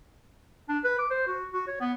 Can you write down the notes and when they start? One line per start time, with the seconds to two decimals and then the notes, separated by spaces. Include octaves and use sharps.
0.69 D4
0.84 B4
0.99 D6
1.10 C5
1.27 F#4
1.53 F#4
1.68 C#5
1.80 B3